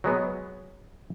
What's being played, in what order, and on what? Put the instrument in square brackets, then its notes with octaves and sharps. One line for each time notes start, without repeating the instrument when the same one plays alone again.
[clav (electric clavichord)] F#3 G#3 B3